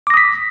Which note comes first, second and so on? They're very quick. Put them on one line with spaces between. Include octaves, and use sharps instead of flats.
D6 A#6 D#6 B6